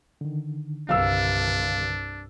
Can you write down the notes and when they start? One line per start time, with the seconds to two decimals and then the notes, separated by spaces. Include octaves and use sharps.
0.21 D3 D#3
0.89 C2 G2 D4 F5 E6